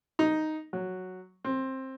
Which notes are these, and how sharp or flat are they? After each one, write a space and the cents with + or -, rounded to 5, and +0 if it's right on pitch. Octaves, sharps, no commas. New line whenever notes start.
D#4 +0
F#3 +0
C4 +15